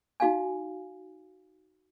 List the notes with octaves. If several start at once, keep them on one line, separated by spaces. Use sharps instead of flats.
D#4 F#4 F5 G#5